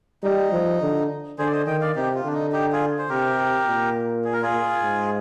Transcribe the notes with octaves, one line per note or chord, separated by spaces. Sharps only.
G3 D#4
F3
D3
D3 G#4 C5
D5
C5 D#5
D#3 D#5 G5
D5 F5
C3 D#4 G4
F4
D3 D4
D#4
D#4 G4
F4 G#4
C5
C3 G4 A#4
A#2
G#4
A#4
F4 G#4
G#2